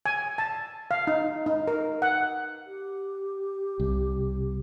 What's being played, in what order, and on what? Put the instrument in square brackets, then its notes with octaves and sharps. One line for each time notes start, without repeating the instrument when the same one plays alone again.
[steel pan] G#5
A5
F5
D#4
D#4
A#4
F#5
[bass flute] G4
[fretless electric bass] C2